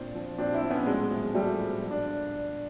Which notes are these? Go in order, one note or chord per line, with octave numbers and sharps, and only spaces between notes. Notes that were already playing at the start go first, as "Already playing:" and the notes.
Already playing: A#2 C4 D4
F3
A#2 C4 D4
D4 E4
F3
B3 C#4
A2 F#3 G#3
F3
G#3
A2 G3 A3
F3
A#2
D4